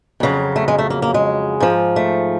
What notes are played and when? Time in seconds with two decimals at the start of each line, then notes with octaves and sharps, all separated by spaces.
0.20 F2 C#3 F#3
0.56 A3
0.68 G#3
0.79 A3
0.90 A#3
1.02 A#3
1.14 G#3
1.60 G#2 F3
1.96 A3